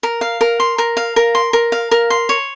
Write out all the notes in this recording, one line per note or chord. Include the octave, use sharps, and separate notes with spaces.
A#4
F5
A#4
C6
A#4
F5
A#4
C6
A#4
F5
A#4
C6
C#5